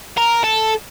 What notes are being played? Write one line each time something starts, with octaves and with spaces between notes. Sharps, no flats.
A#4
A4